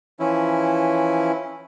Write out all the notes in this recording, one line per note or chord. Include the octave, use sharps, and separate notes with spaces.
E3 F3 C#4 E4